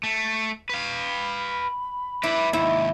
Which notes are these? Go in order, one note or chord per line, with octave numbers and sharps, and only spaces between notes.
A3
B4 F5 B5
E4 B4 D5
D#2 G#2 D#4 E4